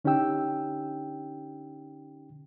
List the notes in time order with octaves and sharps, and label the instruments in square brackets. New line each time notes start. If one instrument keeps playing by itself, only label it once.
[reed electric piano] D3 C#4 D#4 G4 G5 E6